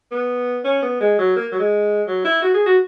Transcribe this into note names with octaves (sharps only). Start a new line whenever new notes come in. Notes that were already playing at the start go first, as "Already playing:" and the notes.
B3
C#4
B3
G#3
F#3
A#3
F#3
G#3
F#3
E4
F#4
G#4
F#4